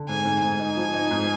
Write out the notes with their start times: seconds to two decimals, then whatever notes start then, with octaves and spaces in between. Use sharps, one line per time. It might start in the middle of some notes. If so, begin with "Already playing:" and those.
Already playing: D3
0.09 G#2 G#5
0.25 G#2
0.42 G#2 G#5
0.59 D#4
0.76 F3
0.94 D#4
1.11 G#2